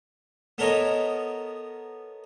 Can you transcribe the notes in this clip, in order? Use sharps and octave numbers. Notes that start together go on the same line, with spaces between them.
B3 A4 A#4 C#5 D#5